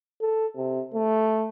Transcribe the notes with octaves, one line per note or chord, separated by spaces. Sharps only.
A4
C3
A3